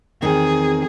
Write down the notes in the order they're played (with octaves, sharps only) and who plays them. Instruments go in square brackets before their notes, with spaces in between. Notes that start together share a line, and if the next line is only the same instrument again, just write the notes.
[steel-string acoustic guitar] E2 D#3 C4 [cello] G#4